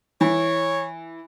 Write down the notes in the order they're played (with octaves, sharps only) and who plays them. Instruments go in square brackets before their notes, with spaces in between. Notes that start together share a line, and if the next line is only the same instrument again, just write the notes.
[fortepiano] E3 [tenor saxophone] C#5